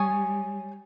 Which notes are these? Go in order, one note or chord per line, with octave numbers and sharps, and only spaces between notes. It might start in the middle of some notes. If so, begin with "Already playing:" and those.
Already playing: G3 C#5 G#5 D#6